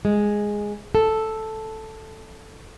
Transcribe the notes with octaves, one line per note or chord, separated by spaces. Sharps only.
G#3
A4